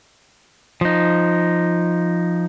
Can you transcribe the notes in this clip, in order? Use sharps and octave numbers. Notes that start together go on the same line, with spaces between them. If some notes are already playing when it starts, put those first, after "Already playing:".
F3 D#4